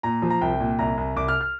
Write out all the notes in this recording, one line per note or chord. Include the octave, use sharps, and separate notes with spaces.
A#2 A#5
F3
A#5
C2 G5
A#2
C2 A#5
C2
C2 D6
F6
F6